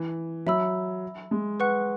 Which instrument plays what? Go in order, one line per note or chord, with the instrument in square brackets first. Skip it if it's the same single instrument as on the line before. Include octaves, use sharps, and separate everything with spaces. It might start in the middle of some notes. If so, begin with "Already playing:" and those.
Already playing: [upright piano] E3
[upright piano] F#3 [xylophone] E5 B5 E6
[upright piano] G#3
[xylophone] B4 F#5 C#6 F#6